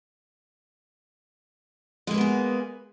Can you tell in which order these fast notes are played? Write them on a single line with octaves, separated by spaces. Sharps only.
G#3 A#3 B4 B3 G#4